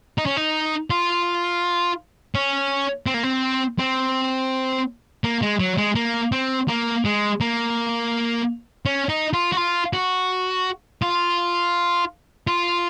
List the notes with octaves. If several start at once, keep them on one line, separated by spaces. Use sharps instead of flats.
D#4
C#4
D#4
F4
C#4
C4
A#3
C4
C4
A#3
G#3
F#3
G#3
A#3
C4
A#3
G#3
A#3
C#4
D#4
F4
F#4
F4
F#4
F4
F4